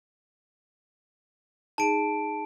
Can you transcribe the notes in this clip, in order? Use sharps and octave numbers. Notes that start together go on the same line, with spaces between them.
D#4 G#4 A5 D7